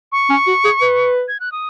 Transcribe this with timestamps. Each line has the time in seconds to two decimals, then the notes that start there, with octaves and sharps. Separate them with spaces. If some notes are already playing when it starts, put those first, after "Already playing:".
0.12 C#6
0.30 C#4
0.47 F#4
0.65 G#4
0.82 B4
1.28 G#6
1.40 F#6
1.52 D#6